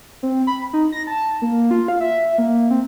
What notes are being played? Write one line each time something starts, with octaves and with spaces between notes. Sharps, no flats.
C4
B5
D#4
A#6
A5
A#3
F4
F5
E5
A#3
C4